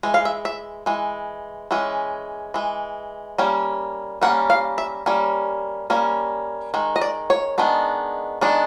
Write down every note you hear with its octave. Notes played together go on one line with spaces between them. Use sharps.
E3 G#3
F5
E5
E5
E3 G#3
E3 G#3 C#4
E3 G#3
G3 A#3 C#4
G3 A#3 C#4 F#5
F5
E5
G3 A#3 C#4
G3 A#3 C#4
D#3 G#3
D#5
D5
C#5
D#3 G#3 B3 D4
D#3 G#3 B3 D4